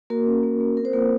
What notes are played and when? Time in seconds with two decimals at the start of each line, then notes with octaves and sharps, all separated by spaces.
0.10 A#3 F#4 A#4
0.27 C#4
0.43 A#3
0.60 A#3
0.77 C4 A#4
0.85 C5
0.93 A#3 F4 A#4